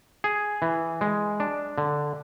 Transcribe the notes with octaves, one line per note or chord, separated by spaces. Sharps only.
G#4
E3
G#3
D4
D3